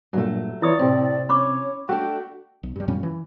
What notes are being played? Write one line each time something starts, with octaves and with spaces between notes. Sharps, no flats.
G2 A#2 F#3 A3
E3 E4 F4 C#5 D5 D#6
A2 C3 C4
C#4 C#5 B5 C#6 D6
A3 D4 F#4 G5
B1
G2 G3
F#2 A#2 G3 C#4
E3